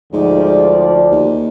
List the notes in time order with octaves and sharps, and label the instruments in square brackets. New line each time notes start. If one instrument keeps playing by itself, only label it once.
[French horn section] D2 F3 D5 [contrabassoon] G#2
[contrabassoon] D#2